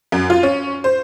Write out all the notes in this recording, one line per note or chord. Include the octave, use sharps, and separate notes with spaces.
F#2
F4
C#4
C5